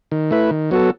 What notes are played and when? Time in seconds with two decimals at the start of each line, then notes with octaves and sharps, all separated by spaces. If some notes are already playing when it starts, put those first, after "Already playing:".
0.12 D#3
0.31 A3 E4 B4
0.51 D#3
0.71 F#3 B3 F#4 A4